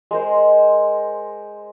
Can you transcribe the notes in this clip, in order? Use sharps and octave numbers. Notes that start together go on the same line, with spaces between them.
G#3 A#4 C5